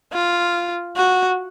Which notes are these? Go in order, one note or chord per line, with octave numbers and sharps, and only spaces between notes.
F4
F#4